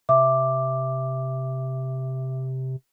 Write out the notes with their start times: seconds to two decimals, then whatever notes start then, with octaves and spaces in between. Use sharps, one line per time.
0.09 C3 E5 D6